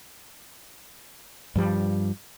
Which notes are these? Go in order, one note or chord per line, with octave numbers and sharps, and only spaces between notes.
G2 F3 G3